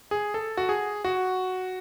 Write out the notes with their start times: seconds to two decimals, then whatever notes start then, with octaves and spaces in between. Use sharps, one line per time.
0.11 G#4
0.34 A4
0.57 F#4
0.69 G#4
1.05 F#4